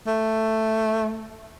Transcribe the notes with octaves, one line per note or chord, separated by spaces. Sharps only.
A3